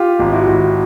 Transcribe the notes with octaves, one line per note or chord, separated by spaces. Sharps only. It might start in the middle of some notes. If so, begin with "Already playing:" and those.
Already playing: F4 G4
G#1
E4 F#4
G#1